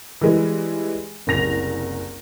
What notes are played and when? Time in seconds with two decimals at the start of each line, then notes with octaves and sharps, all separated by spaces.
0.21 E3 G3 G#3
1.27 F#1 C2 A#6 F7